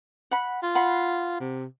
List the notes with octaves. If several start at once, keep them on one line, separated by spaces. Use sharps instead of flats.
F#5 B5
F4
F#5 B5 C6
C3